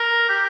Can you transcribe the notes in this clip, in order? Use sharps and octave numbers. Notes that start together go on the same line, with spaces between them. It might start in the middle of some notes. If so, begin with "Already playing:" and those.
Already playing: A#4
G4